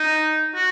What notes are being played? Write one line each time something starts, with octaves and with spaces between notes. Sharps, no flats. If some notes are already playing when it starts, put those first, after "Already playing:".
Already playing: D#4
F#4